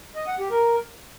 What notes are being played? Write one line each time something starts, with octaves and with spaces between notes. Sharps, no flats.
D#5
F#5
G4
A#4